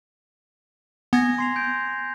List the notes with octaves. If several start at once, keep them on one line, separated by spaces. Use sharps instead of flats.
B3 G#5 G#6 A#6
C6 C7 F7
G6 G#6 D7